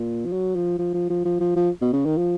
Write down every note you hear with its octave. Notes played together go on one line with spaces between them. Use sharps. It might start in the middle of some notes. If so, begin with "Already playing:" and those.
Already playing: A#2
F3
F#3
F3
F3
F3
F3
F3
F3
F3
B2
C#3
D#3
F3